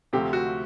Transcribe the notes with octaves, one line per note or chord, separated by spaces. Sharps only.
D2 C3 F3 A3 C4 G4
F#4